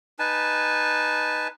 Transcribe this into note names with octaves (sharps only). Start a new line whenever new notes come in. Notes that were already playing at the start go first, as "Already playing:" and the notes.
D#4 B4 G#5 A5